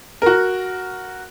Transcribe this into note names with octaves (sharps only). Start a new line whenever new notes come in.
F#4 A#4